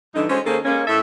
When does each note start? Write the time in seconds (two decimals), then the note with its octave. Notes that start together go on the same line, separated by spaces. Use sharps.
0.14 G2 D3 E3 D#4
0.30 G#3 C#4 F#4 A4 C5
0.46 D#3 A#3 C#4 G#4 A4 C5
0.65 G#3 A#3 C#4
0.87 A2 A4 E5